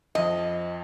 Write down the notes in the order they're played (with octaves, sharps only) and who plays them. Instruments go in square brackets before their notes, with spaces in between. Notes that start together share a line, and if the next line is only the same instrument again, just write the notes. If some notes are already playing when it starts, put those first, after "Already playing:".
[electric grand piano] F2 F3 [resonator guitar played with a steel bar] D#5